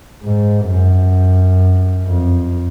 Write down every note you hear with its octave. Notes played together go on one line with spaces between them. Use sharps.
G#2
F#2
F2